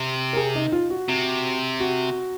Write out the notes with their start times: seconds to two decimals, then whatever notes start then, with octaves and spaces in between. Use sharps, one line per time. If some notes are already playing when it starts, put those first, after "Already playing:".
Already playing: C3
0.33 A#4
0.37 G#4
0.55 D#4
0.72 F4
0.90 F#4
1.09 C3
1.80 F#4